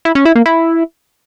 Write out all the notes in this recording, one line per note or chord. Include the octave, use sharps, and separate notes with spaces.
E4
C#4
E4
A#3
E4